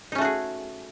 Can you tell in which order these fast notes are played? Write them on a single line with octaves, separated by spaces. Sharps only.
D#4 C#4 A3 F#4 G#4